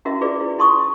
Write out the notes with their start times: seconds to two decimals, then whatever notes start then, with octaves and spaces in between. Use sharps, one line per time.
0.05 C#4 E4 F#4 A#4 D#5 E5
0.21 E4 F4 G#4 B4 D5
0.41 E4
0.58 E4 A5 C6 C#6 D#6